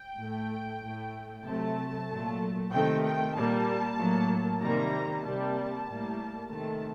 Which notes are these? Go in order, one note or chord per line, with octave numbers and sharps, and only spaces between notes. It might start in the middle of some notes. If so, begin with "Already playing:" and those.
Already playing: G5
A2 A3
A2 A3
C3 F#3 A3 A5
A#2 F#3 A3
C3 D#3 A3 G5
G5
A#2 G3 A#3 A5
A2 F#3 A#3
C3 D#3 G3 A#3 A#5
C3 G3 A#3 A5
A2 G3 A#3
C3 D#3 A3 A5